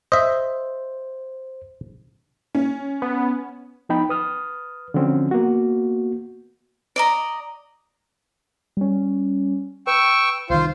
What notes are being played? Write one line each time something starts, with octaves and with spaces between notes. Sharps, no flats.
C5 D#5 E5
C#4
B3
F3 B3 D#4 G5 B5
B4 D#6 F6
D3 F3 F#3 C4 C#4
A#3 B3 F#4
D5 D#5 A#5
G3 C#4
B4 G5 C#6 E6
C2 D#3 F4 C5